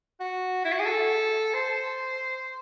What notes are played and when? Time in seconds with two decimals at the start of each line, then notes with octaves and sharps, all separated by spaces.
0.20 F#4
0.65 E4
0.72 F#4
0.80 G#4
0.86 A4
1.54 C5